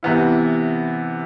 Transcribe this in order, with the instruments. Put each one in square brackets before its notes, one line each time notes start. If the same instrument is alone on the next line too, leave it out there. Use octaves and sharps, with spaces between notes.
[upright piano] C3 E3 B3 E4